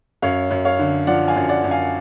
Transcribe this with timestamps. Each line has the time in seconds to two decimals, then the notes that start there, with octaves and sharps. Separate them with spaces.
0.22 F#2 C#5 F5
0.51 F#2
0.65 C#5 F5
0.79 D3
1.07 F3 D5 F#5
1.28 F5 G#5
1.36 F#2
1.49 D5 F#5
1.64 F#2
1.71 F5 G#5